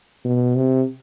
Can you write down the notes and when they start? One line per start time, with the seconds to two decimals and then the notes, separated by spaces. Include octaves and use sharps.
0.25 B2
0.56 C3